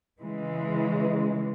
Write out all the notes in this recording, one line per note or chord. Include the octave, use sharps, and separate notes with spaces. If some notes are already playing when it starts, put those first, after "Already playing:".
C#3 E3 G#3